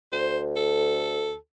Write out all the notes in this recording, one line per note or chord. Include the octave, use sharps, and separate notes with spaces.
D2 C5
A4